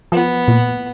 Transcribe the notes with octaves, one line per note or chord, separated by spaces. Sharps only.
F3 B3
A#2